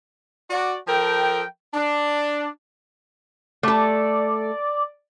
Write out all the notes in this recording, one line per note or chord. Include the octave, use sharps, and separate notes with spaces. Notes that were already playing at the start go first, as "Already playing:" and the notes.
F#4 D5
F3 A4 A#4 G5
D4
A3 A4 D5